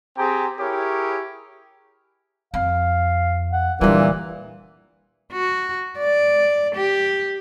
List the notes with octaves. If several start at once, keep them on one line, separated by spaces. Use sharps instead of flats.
C4 G4 G#4 G5 G#5 A#5
E4 G4 G#4 A#4 C#5
F2 F5
F#5
A#2 D3 E3 G3 D4
F#4
D5
G4